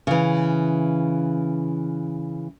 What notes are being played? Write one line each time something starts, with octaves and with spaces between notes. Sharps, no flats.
C#3 E3